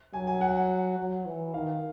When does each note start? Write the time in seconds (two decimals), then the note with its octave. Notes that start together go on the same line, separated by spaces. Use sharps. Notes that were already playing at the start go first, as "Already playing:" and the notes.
0.13 F#3 G#5
0.27 G#5
0.41 F#5
0.98 F#3
1.26 E3
1.54 D#3 F5